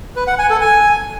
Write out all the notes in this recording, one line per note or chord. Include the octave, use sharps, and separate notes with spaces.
B4
F#5
G#5
A4
G#5